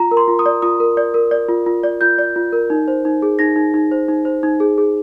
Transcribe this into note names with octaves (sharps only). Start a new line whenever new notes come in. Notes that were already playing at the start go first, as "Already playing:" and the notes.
Already playing: F4 A#5
A#4
C6
F4
D#6
D5
F4 D#6
A#4
D5
A#4
D5
F4
F4
D5
F4 G6
D5
F4
A#4
D#4
C5
D#4
G#4
D#4 A#6
D#4
D#4
C5
D#4
C5
D#4
G#4
G#4